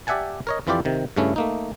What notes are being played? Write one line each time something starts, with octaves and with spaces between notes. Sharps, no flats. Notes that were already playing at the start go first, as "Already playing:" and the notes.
G4 D5 E5 F#5 G#5 A5
A#4 C#5 D#5
F2 E3 E4 F4 G4 D5
C3 D#3
G2 C#3 A3 C#4 E4
A3 A#3 D#4